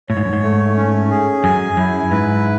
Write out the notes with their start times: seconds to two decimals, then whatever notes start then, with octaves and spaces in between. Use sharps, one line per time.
0.09 A2 C#5
0.17 G#2
0.25 F#2
0.33 G#2
0.42 A3
0.76 C#4
1.10 G#4
1.44 F#2 G#5
1.77 F#2 E4
2.11 G#2 B4